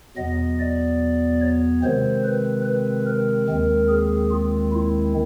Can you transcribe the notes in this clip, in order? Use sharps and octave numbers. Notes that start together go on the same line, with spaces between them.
E2 B2 F#3 B3 D#5
D5
C#5
C3 D#3 G#3 C4 C5
B4
B4
A#4
D#2 D#3 G#3 C4
G#4
F4
E4